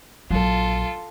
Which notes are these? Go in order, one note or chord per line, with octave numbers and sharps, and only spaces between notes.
A#1 F#3 F4 A4